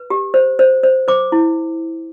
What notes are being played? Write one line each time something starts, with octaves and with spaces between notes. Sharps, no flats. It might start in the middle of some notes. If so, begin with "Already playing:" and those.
Already playing: B4
G4
C5
C5
C5
C5 D6
E4